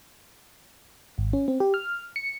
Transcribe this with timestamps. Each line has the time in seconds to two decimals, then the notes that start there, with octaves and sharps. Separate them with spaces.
1.18 G#1
1.33 C#4
1.48 C4
1.60 G4
1.74 F6
2.16 C#7